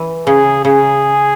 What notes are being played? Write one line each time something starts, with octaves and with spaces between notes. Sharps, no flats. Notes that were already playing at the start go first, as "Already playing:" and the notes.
Already playing: E3
C#3 G#4
C#3 G#4